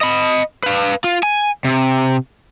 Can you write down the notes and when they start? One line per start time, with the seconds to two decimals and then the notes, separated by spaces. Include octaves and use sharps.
0.01 D#5 B5
0.63 B4 F5
1.04 F4
1.23 G#5
1.65 C3